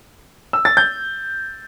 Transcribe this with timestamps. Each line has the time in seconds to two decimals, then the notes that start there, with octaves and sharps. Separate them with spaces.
0.53 E6
0.65 A6
0.77 G6